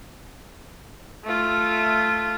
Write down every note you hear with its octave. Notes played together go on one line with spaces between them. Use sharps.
A3 F4